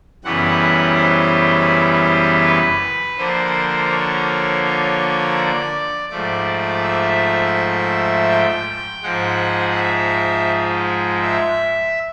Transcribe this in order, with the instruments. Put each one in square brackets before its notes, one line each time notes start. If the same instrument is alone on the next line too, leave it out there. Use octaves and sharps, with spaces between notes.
[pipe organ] F#2 C#3 E3 G3 B3 F#5
C5
B4
D3 F3 A#3 C5
C#5
C#5
D5
G#2 F3 A3 D5
E5
G5
G#2 F3 G#3 F#5
E5
E5